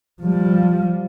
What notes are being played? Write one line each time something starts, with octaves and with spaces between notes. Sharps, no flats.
F3 G3